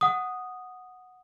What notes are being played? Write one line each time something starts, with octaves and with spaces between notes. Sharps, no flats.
F#5 D#6